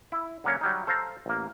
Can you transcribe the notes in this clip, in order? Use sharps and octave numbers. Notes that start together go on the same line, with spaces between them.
E4
D3 F#3 A#3 C#4 C#5
F#3 G3 D#4
A4 C5 F5 A5 A#5
A1 A#3